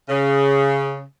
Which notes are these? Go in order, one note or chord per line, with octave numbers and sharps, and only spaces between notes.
C#3